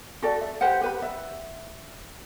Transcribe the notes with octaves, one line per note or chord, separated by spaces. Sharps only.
F#4 A4 D5
E5
G4 B4 C5 F#5
G4 B4 B5
E5